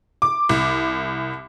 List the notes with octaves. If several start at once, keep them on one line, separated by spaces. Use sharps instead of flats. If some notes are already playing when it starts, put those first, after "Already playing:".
D6
C2